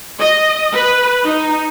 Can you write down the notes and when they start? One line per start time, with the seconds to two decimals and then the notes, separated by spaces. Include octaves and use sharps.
0.20 D#5
0.73 B4
1.26 D#4